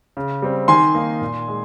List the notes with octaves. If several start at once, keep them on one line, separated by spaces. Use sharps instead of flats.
C#3
G3 C4
D#3 G#5 C6
A#3 D#4
A#2
G#3